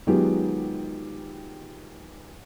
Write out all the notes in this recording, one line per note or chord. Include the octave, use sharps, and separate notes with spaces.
D#3 F#3 G#3 B3 F4 G4